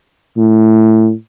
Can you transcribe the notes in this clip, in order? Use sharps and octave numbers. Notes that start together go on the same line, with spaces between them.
A2